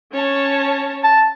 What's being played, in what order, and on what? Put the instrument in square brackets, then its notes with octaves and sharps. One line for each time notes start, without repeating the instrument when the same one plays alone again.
[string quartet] C#4 C#5 A5
[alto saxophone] A5